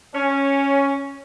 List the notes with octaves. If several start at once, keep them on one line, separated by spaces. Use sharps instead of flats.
C#4